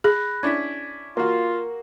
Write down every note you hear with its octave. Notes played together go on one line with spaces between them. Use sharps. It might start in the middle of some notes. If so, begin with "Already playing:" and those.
G#4 B5 F#6 A#6
C#4 D4 E4 G#6 B6
A#3 F4 F#4 A#4